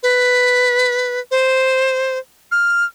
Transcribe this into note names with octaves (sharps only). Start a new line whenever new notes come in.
B4
C5
F6